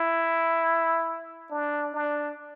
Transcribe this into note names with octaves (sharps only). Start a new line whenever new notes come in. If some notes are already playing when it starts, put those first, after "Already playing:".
Already playing: E4
D4
D4